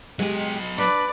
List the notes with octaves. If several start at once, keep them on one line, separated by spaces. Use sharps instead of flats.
F#3 G#3 G4 D#5
D4 B4 D5